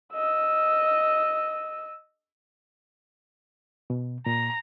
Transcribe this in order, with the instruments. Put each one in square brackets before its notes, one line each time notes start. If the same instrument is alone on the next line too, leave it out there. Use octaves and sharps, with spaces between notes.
[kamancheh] D#5 E6
[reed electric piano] B2
[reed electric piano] A#2 [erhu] A#5